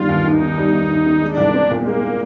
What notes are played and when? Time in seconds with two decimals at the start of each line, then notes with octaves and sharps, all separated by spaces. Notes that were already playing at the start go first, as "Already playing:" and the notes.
Already playing: D#3 G3 F4
0.09 D#2
0.25 D#2 D#4
0.42 D#3
0.58 G3
0.73 D#2
0.90 D#2
1.06 D#3
1.21 G#3 D4
1.37 C2
1.54 C4
1.69 A#2 A#3
1.86 G#3